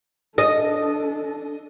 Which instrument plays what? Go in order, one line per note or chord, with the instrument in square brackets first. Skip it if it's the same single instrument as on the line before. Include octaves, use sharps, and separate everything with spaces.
[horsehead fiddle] D4 A4 [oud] D#5